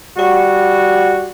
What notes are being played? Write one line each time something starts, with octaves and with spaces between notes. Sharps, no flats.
G3 F#4